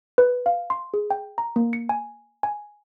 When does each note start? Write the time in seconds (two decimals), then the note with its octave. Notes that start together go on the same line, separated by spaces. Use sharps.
0.18 B4
0.46 F5
0.70 C6
0.94 G#4
1.11 G5
1.38 A#5
1.56 A#3
1.73 C#7
1.89 G#5
2.43 G#5